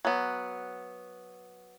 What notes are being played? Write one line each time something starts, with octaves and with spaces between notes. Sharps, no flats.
F#3 B3